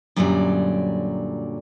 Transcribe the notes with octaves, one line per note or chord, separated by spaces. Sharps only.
F#2 A#2 D3 F#3 G3 D5